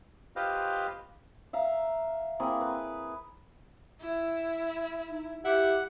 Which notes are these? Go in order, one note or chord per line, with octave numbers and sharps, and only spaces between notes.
F4 G4 B4 C5 D#5 F5
E5 F5 A#5
A#3 C4 E4 G#4
B4
E4
D#4
E4 G4 F#5